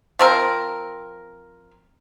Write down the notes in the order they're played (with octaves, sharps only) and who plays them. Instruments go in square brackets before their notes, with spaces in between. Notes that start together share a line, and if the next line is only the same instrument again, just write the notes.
[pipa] F3 C4 A#4